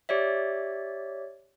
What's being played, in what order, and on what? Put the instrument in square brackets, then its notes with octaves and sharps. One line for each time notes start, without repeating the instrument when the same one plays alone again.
[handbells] G4 C#5 D5 E5